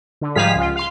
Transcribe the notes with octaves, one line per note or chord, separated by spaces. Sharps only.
D3
G#2 F3 G3 G#4 F5 B6
C#2 F4
F5 C6